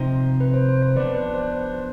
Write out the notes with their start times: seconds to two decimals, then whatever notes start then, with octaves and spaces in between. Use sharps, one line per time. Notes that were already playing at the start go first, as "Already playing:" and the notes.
Already playing: C3 F3 C4 D#4 C5
0.40 B4
0.54 C5
0.69 C5
0.82 C5
0.96 F3 B3 D4 B4 D5
1.15 B4 D5
1.34 C5
1.53 C5